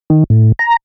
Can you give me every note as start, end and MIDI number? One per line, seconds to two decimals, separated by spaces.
0.10 0.24 51
0.30 0.52 45
0.59 0.77 82